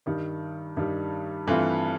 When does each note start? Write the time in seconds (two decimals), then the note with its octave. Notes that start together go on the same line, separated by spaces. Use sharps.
0.06 G2 D#3 G3
0.77 G2 D#3 G3
1.47 G2 E3 A3 C4 F4